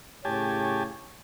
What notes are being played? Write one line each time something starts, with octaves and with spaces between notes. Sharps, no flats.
A2 C#3 G4 C#5 G#5 A5